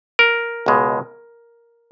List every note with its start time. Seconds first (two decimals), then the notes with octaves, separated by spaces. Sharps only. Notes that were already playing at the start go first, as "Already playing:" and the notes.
0.19 A#4
0.66 C#2 B2 G#3